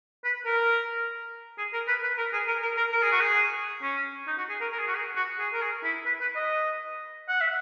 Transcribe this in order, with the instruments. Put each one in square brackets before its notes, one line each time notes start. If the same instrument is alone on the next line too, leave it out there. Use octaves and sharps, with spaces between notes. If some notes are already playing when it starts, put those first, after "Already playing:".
[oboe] B4
A#4
G#4
A#4
B4
B4
A#4
G#4
A#4
A#4
A#4
A#4
G#4
F#4
G#4
C#4
D#4
F#4
G#4
A#4
A#4
G#4
F#4
G#4
F#4
G#4
A#4
G#4
E4
B4
B4
D#5
F#5
E5